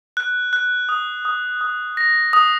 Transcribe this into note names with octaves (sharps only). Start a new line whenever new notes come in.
F#6
F#6
D#6
D#6
D#6
A#6
D#6